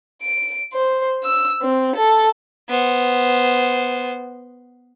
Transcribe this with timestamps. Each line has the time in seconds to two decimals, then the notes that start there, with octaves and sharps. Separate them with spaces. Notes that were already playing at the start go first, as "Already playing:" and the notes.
0.22 D7
0.73 C5
1.24 E6
1.62 C4
1.96 A4
2.69 B3 C5